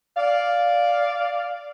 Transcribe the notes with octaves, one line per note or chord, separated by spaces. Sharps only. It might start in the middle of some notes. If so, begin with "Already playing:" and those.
D5 F5